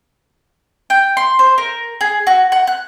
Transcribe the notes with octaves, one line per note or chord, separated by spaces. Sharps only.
G5
C6
C5
A#4
G#4
F#4
F#5
F#6